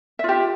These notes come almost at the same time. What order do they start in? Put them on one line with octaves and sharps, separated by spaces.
E5 F4 G4